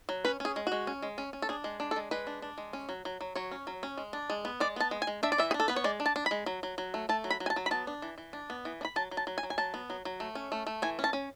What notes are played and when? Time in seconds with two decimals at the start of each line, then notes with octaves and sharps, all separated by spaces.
0.09 F#3
0.25 C#4 B4
0.40 C#4 G#4
0.56 G#3
0.67 F#4
0.72 G#3
0.87 C#4
1.02 G#3
1.18 C#4
1.33 C#4
1.42 A4
1.49 D4 G#4
1.64 G#3
1.80 D4
1.91 A4
1.96 G#3
2.11 G#3 B4
2.27 D4
2.42 D4
2.58 G#3
2.73 C#4
2.89 F#3
3.05 F#3
3.21 F#3
3.36 F#3 C#5
3.51 C#4
3.67 F#3
3.83 C#4
3.98 G#3
4.13 D4
4.30 G#3
4.45 B3
4.60 G#3 D5
4.76 B3 A5
4.91 G#3
5.02 G#5
5.07 G#3
5.23 D4 E5
5.32 D5
5.38 E3 E5
5.51 G#4
5.54 D4
5.60 A4
5.68 B3 B4
5.76 C#5
5.84 G#3 D5
6.00 D4
6.06 A5
6.16 D4
6.26 G#3 B5
6.46 F#3
6.63 F#3
6.78 F#3
6.94 A3
7.09 A3 A5
7.24 F#3
7.31 B5
7.40 F#3
7.46 G#5
7.50 A5
7.56 F#3
7.66 B5
7.71 B3 A5
7.87 D4
8.02 E3
8.18 E3
8.33 D4
8.50 B3
8.65 E3
8.81 D4
8.85 B5
8.96 F#3 A5
9.11 F#3
9.17 A5
9.27 F#3
9.38 G#5
9.43 F#3
9.50 G#5
9.58 F#3 A5
9.74 B3
9.90 F#3
10.05 F#3
10.20 A3
10.35 C#4
10.52 A3
10.67 A3
10.82 E3 G#5
10.99 C#4
11.04 A5
11.13 C#4